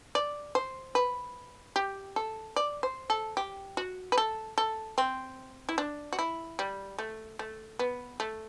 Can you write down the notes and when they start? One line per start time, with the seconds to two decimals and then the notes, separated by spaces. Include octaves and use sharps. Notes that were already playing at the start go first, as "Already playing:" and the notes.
0.15 D5
0.55 C5
0.95 B4
1.76 G4
2.16 A4
2.56 D5
2.83 C5
3.10 A4
3.37 G4
3.77 F#4
4.12 B4
4.18 A4
4.58 A4
4.98 C4
5.69 E4
5.78 D4
6.13 F#4
6.19 E4
6.59 G3
6.99 A3
7.39 A3
7.79 B3
8.20 A3